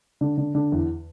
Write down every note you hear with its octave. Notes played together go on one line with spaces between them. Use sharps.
D3
D3
D3
E2